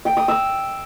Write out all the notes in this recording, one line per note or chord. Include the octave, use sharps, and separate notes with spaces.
G5
D#6
E6